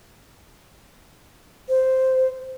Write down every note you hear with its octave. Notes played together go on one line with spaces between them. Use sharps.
C5